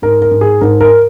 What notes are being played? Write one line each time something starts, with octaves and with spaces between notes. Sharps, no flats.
G#2 A#4
A#4
G#2
G#4
G#2 A#4
A#4